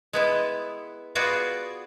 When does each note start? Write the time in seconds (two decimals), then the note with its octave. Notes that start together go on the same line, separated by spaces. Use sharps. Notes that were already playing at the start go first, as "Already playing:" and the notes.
0.13 G#3 B3 E4
1.15 B3 F4 F#4 G#4 D5